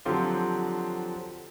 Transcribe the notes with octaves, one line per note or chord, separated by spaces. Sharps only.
D3 F3 F#3 C4 F4 G4